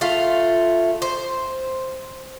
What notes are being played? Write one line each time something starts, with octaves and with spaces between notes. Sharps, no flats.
A3 F4 F5
C5